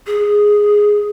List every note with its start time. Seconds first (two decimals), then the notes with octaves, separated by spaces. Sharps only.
0.07 G#4